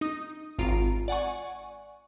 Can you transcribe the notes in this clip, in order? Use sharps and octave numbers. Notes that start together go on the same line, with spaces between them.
D#4 D#6
G#1 F4 A#5 D7
D5 F#5 G#5 C#6